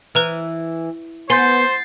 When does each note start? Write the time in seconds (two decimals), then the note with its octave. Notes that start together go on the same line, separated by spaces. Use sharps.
0.15 E3 B4 A#5 F6
1.30 B3 C5 G#5 C6 G6 A6 C7